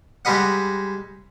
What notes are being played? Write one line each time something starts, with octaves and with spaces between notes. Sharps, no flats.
G3 G#3 B4 D#5 F#5